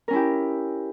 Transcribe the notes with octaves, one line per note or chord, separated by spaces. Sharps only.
C#4 E4 G4 A#4